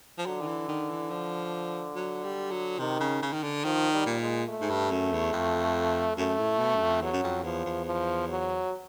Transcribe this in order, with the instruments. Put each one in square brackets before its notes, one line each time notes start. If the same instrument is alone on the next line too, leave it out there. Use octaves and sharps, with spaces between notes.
[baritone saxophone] F3
[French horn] D3 [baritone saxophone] F#3
[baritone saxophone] D#3
E3
D#3
E3
F3
F#3
G3
F#3
[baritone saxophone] C3 [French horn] D#3
[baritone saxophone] C#3
C#3
D#3
D3
[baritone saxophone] D#3 [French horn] F3
[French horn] G3
[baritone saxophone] A#2
[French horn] G#3
A3
[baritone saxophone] G#2
G2
F#2
E2
F2
[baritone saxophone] F#2 [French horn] A3
[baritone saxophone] A2
B2
F#2
F2
[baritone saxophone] E2 [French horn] F#3
[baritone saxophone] F#2
F2
[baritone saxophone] E2 [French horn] F3
[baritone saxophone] E2
[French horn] F3
F#3